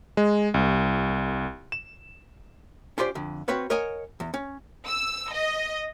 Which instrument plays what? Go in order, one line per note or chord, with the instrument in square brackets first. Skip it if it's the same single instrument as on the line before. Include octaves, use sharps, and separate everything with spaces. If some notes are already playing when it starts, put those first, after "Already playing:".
[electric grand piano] G#3
C2
E7
[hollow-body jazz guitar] C#4 F4 G4 C5 D5
F2 D3
C4 F#4 B4 C#5 F5
A#4 C#5 D#5 F#5 G#5
E2
C#4
[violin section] E6
D#5